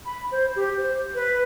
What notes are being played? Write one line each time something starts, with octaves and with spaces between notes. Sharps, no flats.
B5
C5
G4
C5
B4